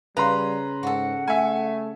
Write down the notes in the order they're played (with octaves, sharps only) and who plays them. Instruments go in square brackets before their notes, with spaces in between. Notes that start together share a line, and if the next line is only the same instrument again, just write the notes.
[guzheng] C#3 [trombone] G3 [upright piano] B4 A#5 C6
[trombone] G#2 [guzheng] F#4 A4 [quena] F#5
[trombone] A3 [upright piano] E5 G#5